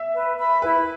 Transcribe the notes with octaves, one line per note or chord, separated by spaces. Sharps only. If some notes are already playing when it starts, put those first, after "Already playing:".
Already playing: E5
B4
E5 B5
E4 B4